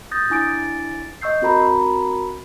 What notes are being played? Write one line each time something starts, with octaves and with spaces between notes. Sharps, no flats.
D#6 G6 A6 A#6
D4 E4 G#5 D6 A6 D7
D#5 C#6 E6 G6 C7
C4 F#4 A#4 A#5 B5